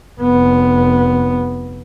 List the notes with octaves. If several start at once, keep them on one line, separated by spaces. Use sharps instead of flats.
F1 B3